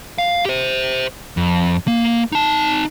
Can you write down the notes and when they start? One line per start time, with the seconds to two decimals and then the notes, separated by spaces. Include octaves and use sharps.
0.18 F5
0.45 G4 C5
1.37 F2
1.87 A#3
2.32 D#4 A5